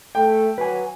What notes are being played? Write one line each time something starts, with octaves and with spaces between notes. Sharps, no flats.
A3 G5
F#3 B4 G#5